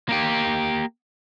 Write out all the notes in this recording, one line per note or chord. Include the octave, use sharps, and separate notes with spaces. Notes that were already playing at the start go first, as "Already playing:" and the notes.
A#3 G4